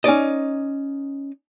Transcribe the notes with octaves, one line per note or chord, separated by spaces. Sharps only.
C#4 D#4 D5 D#5